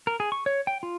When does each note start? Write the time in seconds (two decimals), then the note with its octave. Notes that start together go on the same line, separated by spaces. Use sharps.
0.07 A#4
0.20 G#4
0.32 C#6
0.46 C#5
0.67 G5
0.83 F4